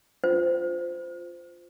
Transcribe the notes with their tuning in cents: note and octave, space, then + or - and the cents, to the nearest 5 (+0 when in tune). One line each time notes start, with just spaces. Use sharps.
F4 +0 C5 -15